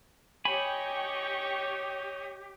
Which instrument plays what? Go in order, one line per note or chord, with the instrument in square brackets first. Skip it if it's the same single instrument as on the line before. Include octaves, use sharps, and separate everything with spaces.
[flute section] G4 [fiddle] C#5 D#5 [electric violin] G5 C#6 [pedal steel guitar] G#5 B5